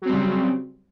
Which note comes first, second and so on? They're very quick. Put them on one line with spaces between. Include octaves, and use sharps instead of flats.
F#3 C4 G3 C#3